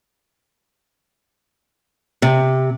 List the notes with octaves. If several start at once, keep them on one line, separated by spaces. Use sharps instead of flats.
C3